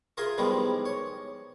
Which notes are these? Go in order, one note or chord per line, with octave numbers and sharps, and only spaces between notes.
F4 G#4 A#4 E5 G#5 C6
D#3 F3 G3 G#3 B3 E4
C#5